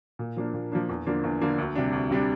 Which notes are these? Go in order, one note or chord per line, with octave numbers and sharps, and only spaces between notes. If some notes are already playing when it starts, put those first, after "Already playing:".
A#2
F3 A#3 D4
A#2
F3 A#3 D4
E2
D3 F3 A#3 D4
E2
D3 F3 A#3 D4
D2
C3 G3 D4
D2
C3 G3 D4